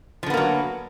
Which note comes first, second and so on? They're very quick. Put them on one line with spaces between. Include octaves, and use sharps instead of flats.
F3 D3 B3 A#3 F#3